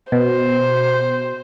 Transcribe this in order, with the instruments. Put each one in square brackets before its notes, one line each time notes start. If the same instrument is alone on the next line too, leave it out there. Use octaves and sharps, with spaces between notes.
[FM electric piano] B2 [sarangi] C5